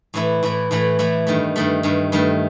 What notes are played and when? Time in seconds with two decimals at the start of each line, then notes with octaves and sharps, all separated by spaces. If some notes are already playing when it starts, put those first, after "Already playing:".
0.14 A2 E3 A3 E4
0.43 A2 E3 A3 E4
0.71 A2 E3 A3 E4
0.99 A2 E3 A3 E4
1.27 G2 D#3 A3
1.56 G2 D#3 A3
1.83 G2 D#3 A3
2.12 G2 D#3 A3